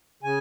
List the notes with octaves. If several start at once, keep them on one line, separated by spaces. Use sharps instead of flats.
C#3 G#5